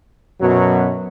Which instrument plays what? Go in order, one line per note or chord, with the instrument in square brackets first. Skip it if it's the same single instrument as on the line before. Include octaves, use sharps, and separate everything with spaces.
[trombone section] F#2 B2 F#3